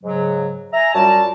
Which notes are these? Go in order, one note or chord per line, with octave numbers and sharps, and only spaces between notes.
G#2 C#3 F#3
E5 G#5 A#5
F#2 F#3 G3 F4 D5 A5